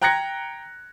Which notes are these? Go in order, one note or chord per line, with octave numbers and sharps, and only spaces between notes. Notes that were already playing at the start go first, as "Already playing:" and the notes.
G5 A#5 F#6 G#6 A#6 C#7